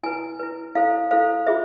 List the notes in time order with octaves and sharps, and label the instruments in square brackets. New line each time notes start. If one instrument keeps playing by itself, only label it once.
[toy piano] E4 B4 G#5
E4 B4
E4 A4 C5 F5
E4 A4 C5 F5
F4 G#4 C5 E5